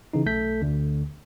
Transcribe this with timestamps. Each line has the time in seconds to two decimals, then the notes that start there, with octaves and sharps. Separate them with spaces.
0.13 C#3 E3 D#4
0.26 B1 A3 A4 G6 B6
0.62 D2 D3